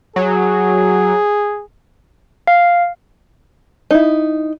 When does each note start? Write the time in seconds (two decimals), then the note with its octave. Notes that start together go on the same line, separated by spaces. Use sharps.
0.16 F#3 G#4
2.47 F5
3.91 D#4 E4